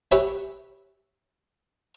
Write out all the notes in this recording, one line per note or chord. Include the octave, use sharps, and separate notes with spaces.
G4 B4 C#5 E5 F#5 G#5